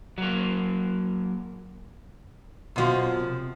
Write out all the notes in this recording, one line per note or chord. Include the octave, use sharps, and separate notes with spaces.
F#3 A#3
F#2 B2 F3 F#4
C3